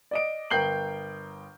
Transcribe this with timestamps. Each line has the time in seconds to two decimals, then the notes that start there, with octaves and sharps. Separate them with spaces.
0.11 D5 D#5 D7
0.50 G1 A#4 G5 G6 C7 F#7